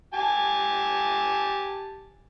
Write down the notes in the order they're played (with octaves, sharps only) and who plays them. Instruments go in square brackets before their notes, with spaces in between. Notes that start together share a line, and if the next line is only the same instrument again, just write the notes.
[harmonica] G4 G#5 A5